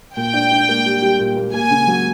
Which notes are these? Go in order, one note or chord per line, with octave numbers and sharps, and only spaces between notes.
A#2 G5
D4
D4
A#3
G3
G3
A#2
A#3
A#3 G#5
C#3
F#3